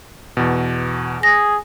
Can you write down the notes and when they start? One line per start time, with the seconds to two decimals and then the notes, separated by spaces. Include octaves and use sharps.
0.37 E2 B2
1.23 G#4 A#6